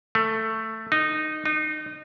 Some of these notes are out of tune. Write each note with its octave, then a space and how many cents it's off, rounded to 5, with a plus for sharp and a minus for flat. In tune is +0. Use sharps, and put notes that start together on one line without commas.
A3 +10
D#4 -15
D#4 -30